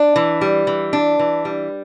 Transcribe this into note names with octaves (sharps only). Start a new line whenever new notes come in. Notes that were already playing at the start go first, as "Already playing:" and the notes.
Already playing: D4
E3
G3
E3
D4
E3
G3